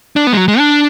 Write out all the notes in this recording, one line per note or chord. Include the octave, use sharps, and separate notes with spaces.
D4
B3
G#3
F#3
G#3
D4